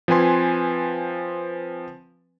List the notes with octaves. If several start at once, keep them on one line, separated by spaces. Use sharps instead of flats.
F3 C4 B4 G#5 C6